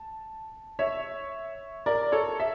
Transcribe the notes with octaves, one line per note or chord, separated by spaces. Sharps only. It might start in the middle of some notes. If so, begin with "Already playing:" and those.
Already playing: A5
C#5 E5
A#4 D5
A4 C#5
E5